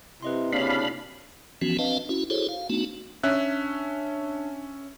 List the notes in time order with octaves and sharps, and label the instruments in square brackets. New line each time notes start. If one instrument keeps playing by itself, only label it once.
[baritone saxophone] C3 [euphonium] E4 [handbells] B4 D#5 C6
[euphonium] C#3 [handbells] A#3 E4 F#4 [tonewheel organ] D4 F5 B5
[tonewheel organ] E3 F3 B3 C#4 F#4
C4 D4 B4 D#5 F5 A5
C#4 E4 F#4
E4 F#4 G#4 A4 C5 C#5
F5
A3 B3 D4 D#4 F#4
[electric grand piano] C#4 E5 F#6 [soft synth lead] D4